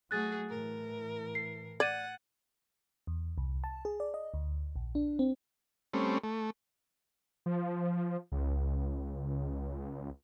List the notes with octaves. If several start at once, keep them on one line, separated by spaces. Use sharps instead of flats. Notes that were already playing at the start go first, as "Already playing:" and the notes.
F#3 A3 F#4 G#4 F#6 A6
A2 E3 A#4
C7
D5 F#5 G#6 A6 D#7
E2
C2
A5
G#4
D5
D#5
D2
A#1
D4
C4
G3 A3 C4 C#4
A3
F3
C#2